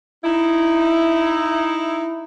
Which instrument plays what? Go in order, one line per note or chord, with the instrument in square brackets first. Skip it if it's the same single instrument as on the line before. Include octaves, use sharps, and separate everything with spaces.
[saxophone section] D#4 E4